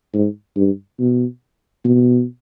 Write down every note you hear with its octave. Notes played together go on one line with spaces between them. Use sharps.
G#2
G2
B2
B2